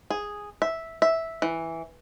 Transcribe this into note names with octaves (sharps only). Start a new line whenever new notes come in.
G#4
E5
E5
E3